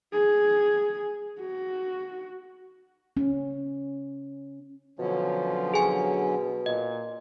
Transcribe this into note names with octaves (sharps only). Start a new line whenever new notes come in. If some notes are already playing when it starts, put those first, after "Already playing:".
G#4
F#4
C#4
B2 D3 F3 F#3 C#4
G#4 G#5
A#2 D#5